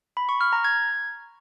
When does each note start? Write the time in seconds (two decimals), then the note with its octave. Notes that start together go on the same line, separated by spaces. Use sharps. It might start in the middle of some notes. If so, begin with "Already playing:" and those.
0.17 B5
0.29 C#6
0.41 F6
0.53 A#5
0.64 G#6